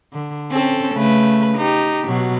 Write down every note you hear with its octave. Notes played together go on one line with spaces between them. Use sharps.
D3
C4 C#4 A4
C#3 A3 B4
D#4 G4
B2 F#3